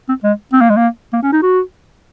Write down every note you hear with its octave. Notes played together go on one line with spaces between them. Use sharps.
C4
G#3
C4
A#3
G#3
A#3
A#3
C#4
D#4
F#4